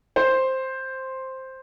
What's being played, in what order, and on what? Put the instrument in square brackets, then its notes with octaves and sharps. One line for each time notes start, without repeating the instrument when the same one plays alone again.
[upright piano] C5